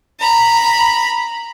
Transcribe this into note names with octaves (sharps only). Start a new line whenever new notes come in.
A#5 B5